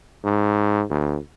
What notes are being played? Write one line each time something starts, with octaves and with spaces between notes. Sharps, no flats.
G#2
D2